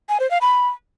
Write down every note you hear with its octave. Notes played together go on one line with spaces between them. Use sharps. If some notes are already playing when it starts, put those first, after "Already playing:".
G#5
C5
F5
B5